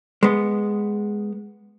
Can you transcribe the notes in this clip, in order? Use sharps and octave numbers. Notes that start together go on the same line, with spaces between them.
G#3 B3